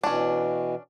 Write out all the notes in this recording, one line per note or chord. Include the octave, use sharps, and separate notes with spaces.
B2 E3 C#4 D4